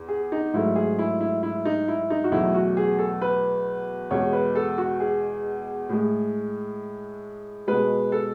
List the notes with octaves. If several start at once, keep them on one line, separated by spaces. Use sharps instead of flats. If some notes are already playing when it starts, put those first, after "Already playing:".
Already playing: E2
G#4
D#4
G#2 F#3 A3 E4
G#4
E4
E4
E4
D#4
E4
D#4
F#4
E2 B2 F#3 A3 E4
F#4
G#4
A4
B4
E2 B2 G#3 C#5
B4
A4
F#4
G#4
A2 G#3
B2 G#3 B4
A4